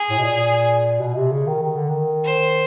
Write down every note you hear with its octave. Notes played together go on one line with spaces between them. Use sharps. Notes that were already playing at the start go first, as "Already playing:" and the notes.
Already playing: G#4
A2
B2
A#2
B2
C3
C#3
D#3
D#3
D3
D#3
C5